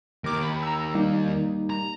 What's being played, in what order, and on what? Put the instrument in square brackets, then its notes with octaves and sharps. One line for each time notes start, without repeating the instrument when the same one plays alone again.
[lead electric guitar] D#2 [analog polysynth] A#4 D6
[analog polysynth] B5
A#5 E6
G3 A#3 D#4
[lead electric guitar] A#5